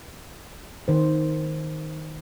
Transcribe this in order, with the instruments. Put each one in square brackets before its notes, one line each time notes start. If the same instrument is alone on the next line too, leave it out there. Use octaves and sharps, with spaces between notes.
[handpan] D#3 C5